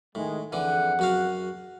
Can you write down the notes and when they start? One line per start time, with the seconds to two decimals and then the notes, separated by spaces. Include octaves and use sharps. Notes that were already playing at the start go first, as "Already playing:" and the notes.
0.15 A2 D#3 G#3
0.52 F2 D3 E3 G#4 F#5
0.99 F#2 F#4 F5